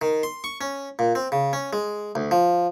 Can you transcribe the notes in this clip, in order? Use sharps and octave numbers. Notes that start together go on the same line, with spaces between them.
D#3
C6
C#6
C#4
A#2
C4
C#3
C#4
G#3
D2
F3